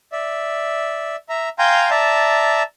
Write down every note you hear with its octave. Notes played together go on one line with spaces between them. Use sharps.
D5 E5
E5 A#5
F5 G5 G#5 A#5 C6 G6
D5 E5 A5 A#5